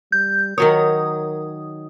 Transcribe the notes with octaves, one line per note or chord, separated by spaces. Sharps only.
G3 G6
D#3 F#3 A#4 C#5 D#6